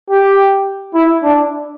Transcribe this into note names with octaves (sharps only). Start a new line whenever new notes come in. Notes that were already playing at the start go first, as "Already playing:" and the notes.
G4
E4
D4